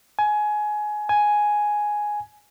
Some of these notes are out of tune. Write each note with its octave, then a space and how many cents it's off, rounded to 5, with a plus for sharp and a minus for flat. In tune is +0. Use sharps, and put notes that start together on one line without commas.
G#5 +20
G#5 +5